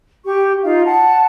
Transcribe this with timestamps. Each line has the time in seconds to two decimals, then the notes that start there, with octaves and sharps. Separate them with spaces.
0.25 G4 C#6
0.63 D#4 F4 F5
0.85 F#5 A5